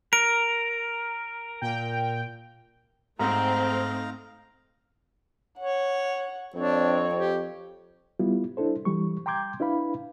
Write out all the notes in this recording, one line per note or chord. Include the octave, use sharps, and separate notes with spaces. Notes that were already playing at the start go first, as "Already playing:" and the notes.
A#4 D7
A#2 G5
G#2 A3 C4 D#4 F5 A#5
C#5 F#5
F2 C4 D4 C#5
G4
G3 B3 E4 F4
D4 E4 A4 C5
E3 G3 C#6
G5 A#5 C6 D6 G6 G#6
D4 E4 B4 F5 B5